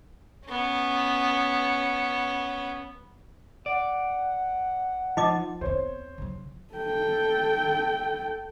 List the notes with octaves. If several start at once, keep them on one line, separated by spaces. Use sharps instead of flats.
B3 C#4
D5 F#5
F3 D#4 D#5 D6
E2 C4 C5 C#5
C#3 F#3
A4 G5